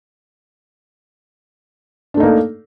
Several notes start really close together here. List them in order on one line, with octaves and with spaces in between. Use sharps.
D4 A3 D#4 A#3 A4